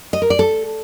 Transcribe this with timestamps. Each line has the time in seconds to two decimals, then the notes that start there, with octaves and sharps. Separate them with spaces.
0.13 D#5
0.22 A#4
0.30 D5
0.39 A4